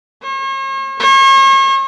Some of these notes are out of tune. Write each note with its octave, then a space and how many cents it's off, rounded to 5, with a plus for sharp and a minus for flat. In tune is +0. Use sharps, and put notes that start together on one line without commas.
C#5 -45
C#5 -40